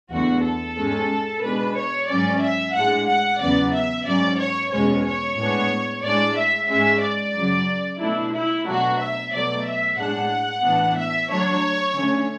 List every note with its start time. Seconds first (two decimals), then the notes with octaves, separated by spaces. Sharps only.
0.11 E2 D3 A3 F#4
0.44 A4
0.78 G#2 G#3 C#4
1.43 B2 G#3 D4 B4
1.77 C#5
2.09 G#2 F#3 C#4 D5
2.42 E5
2.75 A2 G#3 D4 F#5
3.08 F#5
3.40 E2 C#3 F#3 B3 D5
3.73 E5
4.06 G#2 F#3 C#4 D5
4.39 C#5
4.72 E2 B2 G#3 C#4 C#5
5.06 C#5
5.37 A2 G#3 B3 D4
6.04 A2 G#3 D4 D5
6.37 E5
6.69 G#2 G#3 C#4 E5
7.02 D5
7.36 F#2 C#3 F#3
8.00 B2 A3 D4 E4
8.34 E4
8.66 B2 F#3 A3 D4 F#4
8.99 E5
9.32 B2 F#3 A3 D5
9.65 E5
9.98 A2 G#3 D4 F#5
10.64 A2 E3 B3 D4
10.96 E5
11.29 D3 F#3 A3 D4 C#5
11.95 D3 A3 C#4